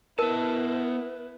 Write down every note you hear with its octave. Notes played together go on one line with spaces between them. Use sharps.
B3 E4 A#4 B4 A5